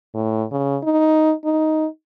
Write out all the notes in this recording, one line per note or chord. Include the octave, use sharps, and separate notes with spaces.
A2
C#3
D#4
D#4